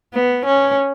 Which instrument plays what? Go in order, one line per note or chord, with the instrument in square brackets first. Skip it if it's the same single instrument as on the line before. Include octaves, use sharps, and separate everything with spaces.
[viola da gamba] B3
C#4